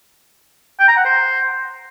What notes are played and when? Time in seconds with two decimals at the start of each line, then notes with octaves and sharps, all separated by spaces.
0.79 G5
0.88 A#5
0.97 F#5
1.05 C5